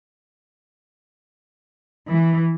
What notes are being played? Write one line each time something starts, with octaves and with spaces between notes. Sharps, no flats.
E3